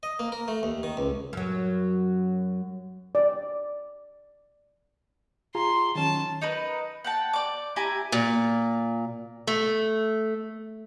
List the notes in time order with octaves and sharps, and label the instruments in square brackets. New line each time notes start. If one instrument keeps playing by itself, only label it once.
[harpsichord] D#5
A#3
A#4
A3
D#2
D#3
C#2
[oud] F#2 F#3
[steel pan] D5
[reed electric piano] F4 G#4 A#5 [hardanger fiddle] C6
[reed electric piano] D#3 F#3 C#4 [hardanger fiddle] A5
[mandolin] D#4 A#4 B4
F#5 G5 A5
D5 D6
E4 G4 G#5 A#5
[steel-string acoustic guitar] A#2
A3